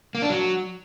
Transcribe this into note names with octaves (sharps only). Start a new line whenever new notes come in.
A#3
D4
F#3